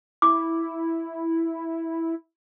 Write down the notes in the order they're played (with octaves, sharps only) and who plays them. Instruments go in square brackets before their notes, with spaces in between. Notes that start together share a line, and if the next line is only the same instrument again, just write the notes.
[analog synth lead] E4 [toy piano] D6